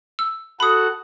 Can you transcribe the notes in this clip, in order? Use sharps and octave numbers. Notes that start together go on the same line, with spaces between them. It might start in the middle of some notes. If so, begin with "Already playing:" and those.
E6
F#4 A4 F#5 B5 D#6